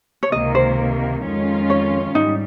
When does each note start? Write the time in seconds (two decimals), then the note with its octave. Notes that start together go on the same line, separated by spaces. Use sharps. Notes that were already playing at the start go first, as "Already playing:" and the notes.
0.23 C#5
0.32 C#2 C3 D#3 A#3 D#5
0.55 C5
1.24 F2 D#3 G#3 C#4 F4
1.70 C#5
2.15 G#2 G3 D#4